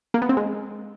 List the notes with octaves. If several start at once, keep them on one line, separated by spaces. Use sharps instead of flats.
A#3
B3
C4
G#3